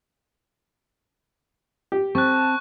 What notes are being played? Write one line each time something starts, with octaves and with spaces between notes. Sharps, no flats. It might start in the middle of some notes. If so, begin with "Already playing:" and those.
G4
C4 A5 C#6 F#6